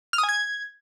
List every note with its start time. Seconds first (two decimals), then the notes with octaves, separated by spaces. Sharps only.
0.13 F6
0.18 D#6
0.23 G#5
0.29 G#6